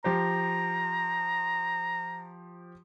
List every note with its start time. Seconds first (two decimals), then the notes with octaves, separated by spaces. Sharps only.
0.04 F3 G4 C5 A#5